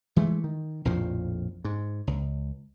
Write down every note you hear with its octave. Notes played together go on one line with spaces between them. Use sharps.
E3 G#3 A3
D#3
A#1 F2 A2 F3
G#2
C#2